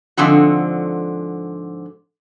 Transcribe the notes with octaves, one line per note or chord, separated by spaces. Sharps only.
G#2 D3 F3 C4 F#4